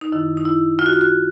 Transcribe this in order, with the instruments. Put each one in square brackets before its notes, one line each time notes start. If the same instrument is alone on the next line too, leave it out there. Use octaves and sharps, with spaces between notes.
[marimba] D#4
F#2 D#3 E4
D#4
E4
F4
F#4
F4
F#4